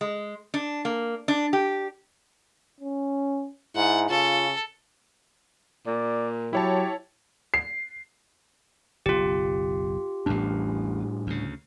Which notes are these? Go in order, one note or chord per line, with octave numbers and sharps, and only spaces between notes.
G#3
D4
A#3
D4
G4
C#4
G#2 E4 F#5
C#3 F4 A4
A#2 D5
F#3 E4 G4 C#5 A5
C7
F#1 B1 F4 G4
A1 E2 A2 G3 D4
D2 C#3